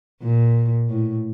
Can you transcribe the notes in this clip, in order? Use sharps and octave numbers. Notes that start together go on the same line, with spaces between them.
A#2
A2